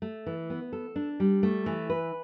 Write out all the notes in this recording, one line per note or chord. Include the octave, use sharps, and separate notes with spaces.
A3
E3
B3
A4
D4
G3
A3
E3
B4